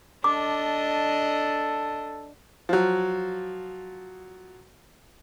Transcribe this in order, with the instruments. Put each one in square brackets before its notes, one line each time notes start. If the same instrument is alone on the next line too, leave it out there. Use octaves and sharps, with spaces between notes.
[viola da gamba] D4 D#5 [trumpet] A4 [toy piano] D6
[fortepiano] F3 F#3